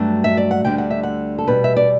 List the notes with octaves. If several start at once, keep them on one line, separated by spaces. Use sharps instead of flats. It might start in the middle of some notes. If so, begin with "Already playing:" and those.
Already playing: G2 F#3 A3
E5
D5
F#5
D2 D3 G3 G5
F#5
E5
F#5
A4
E2 B2 G3 B4
E5
D5